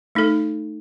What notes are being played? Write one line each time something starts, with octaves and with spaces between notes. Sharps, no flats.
A3 D#4 A4